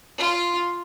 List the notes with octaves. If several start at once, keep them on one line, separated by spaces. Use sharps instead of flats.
F4